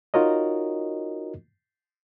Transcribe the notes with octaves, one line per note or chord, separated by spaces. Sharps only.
D#4 F4 F#4 A#4 C#5 D#5